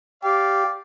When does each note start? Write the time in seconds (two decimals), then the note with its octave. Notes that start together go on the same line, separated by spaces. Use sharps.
0.23 G4 D5 F5